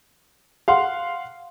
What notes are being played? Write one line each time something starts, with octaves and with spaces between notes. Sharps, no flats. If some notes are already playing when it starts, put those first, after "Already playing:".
F5 F#5 C6